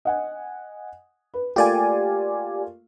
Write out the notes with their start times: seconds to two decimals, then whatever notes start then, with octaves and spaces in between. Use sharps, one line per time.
0.05 D#5 F#5 G#5
1.34 B4
1.56 A3 A#3 F4 G4 D5 G#5